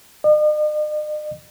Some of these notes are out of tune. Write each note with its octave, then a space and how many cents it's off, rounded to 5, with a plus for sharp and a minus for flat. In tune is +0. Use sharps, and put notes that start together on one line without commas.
D#5 -45